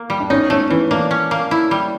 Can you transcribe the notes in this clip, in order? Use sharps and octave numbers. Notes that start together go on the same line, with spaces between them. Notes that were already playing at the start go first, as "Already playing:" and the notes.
Already playing: A#3
G3
D4
C#4 D#4
A3 C#4
E3 C#4
A#3 D4
C#4
A#3
E4
G3